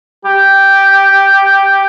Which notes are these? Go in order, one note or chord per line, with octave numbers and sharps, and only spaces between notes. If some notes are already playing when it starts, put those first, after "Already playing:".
G4